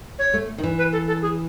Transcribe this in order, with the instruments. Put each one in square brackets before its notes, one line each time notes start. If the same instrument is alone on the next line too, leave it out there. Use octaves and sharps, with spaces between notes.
[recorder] C#5
[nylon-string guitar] A3
D#3
E3
[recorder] B4
A4
A4
G#4